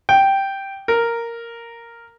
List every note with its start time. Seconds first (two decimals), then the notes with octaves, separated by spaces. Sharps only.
0.09 G5
0.88 A#4